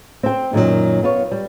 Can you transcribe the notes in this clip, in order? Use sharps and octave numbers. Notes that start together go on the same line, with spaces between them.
C4 G5
F#2 A#2 D#3 F3 F#3
B3 F4 C#5
G3